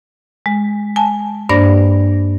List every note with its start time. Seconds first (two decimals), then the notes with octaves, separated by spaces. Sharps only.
0.46 G#3
0.96 G#5 A5
1.49 G2 A#3 D4 C5 D5 A#6